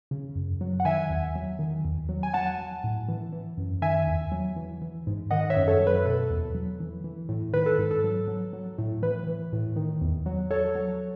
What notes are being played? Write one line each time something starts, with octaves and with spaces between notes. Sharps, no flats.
C#3
F#2
F#3
F#5
D#3 E5 G#5
E2
F#3
D#3
E2
F#3
G#5
F#3 F#5 A5
F#3
A2
E3
E3
F#2
D#3 E5 G#5
E2
F#3
E3
E3
G#2
D#3 D#5 F#5
C#5 E5
F#2
A4 C#5
F#3
B4
B2 A4
E2
F#3
E3
E3
A2
D#3 B4
A4
G#2
A4
F#3
F#3
F#3
A2
E3 B4
E3
A2
D#3
E2
F#3
F#3 A4 C#5
F#3